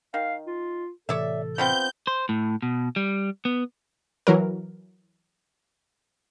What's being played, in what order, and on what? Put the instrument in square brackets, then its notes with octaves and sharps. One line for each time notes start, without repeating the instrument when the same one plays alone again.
[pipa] D#3 [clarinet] F5
[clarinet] F4
[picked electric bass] A2 C3 E3 [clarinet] A4 [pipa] C#5 D5 E5
[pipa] F3 B3 C4 [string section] G6
[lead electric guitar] C5
A2
B2
G3
B3
[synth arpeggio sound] E3 F#3 A#4